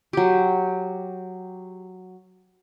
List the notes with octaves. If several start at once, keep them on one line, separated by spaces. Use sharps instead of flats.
F#3 G4